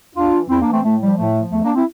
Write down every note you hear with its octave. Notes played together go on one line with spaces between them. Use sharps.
E2 D4 F4
E3
E2 C4 E4
A#3 D4
E3
A3 C4
A2 A3
F3 G3
A2 A3
F3
E2 A3
A#3 D4
C4 E4